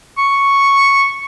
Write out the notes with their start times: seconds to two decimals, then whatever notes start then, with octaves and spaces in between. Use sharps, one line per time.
0.18 C#6